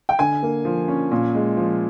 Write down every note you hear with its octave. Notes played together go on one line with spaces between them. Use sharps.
G5
D3 G#5
A#3
F3
C#4
A#2
G#3
F3